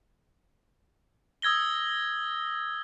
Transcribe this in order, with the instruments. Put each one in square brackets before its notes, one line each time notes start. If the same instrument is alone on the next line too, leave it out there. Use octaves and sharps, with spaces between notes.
[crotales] D#6 E6 G#6 A#6 G7